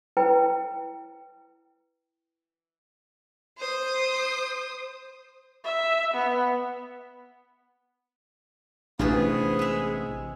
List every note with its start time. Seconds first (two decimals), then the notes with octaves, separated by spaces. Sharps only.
0.17 E4 B4 G5
3.57 C5 D#6
5.65 E5
6.15 B3
8.99 A1 C3 B3 D4 F4 F#4 G#4 B4
9.59 G#3 E5